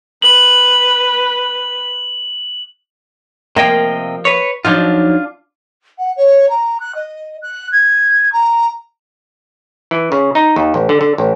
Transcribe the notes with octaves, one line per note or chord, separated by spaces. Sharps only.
B4 F#7
C3 F3 A#3 D#5 G5
B4 C#5
F3 F#3 D4 D#4 F4
F#5
C#5
A#5
F#6
D#5
F#6
G#6
A#5
E3
C#3
D#4
D#2
A1
D3
D3
A1